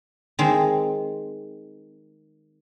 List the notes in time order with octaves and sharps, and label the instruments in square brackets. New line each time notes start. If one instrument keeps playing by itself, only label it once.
[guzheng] D#3 G#3 C4